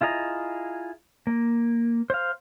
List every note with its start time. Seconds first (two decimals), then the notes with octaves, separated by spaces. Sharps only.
0.01 E4 F4 G#4 D#5 A#5
1.27 A#3
2.10 C5 F5